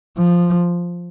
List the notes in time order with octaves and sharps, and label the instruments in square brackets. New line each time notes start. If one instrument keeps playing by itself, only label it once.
[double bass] F3